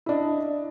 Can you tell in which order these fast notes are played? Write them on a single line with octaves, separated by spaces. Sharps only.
E4 D4 D#5